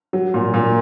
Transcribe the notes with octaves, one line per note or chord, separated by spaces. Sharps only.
F#3
A#2
A#2